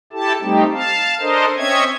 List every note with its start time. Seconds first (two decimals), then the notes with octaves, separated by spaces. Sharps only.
0.13 E4 G4 A4 A5
0.42 G3 A3 C4 D#4 G4
0.73 F5 A5
1.20 D4 A4 A#4 C5 D#5
1.57 C4 C#4 C#5 D#5 E5 G#6